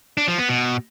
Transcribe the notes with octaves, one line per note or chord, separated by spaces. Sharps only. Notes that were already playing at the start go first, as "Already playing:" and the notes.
D4
F3
B3
B2